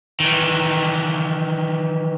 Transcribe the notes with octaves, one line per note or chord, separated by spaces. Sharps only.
D#3 E3